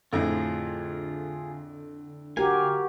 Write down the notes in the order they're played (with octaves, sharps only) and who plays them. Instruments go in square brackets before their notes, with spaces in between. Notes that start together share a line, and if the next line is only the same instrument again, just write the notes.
[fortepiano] F2 A2 [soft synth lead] D3 [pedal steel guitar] F4 G#4
[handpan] F#4 G4 A#4 [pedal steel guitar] F5 G#5